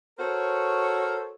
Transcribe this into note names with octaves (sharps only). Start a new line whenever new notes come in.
F#4 A4 A#4 C5 C#5